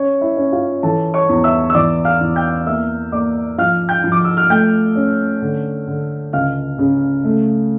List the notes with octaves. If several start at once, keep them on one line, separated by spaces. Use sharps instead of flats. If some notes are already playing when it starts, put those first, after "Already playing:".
Already playing: C#4 C#5
E4 E5
C#4
F4 F5
E3 A4 A5
C#5 C#6
E2
E5 E6
E6
E3 D5 D6
F5 F6
E2
G5 G6
A#3 E5 E6
A#3 D5 D6
F3 F5 F6
G5 G6
F3
D6
E6
F6
A3 G5 G6
C#4
D3
D3
C#2 F5 F6
C#3
A3